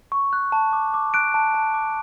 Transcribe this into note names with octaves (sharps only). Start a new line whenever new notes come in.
C#6
F#6
A5
D6
D6
F#6 D7
A5
A5
D6